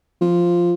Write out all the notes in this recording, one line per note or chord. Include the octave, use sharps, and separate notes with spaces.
F3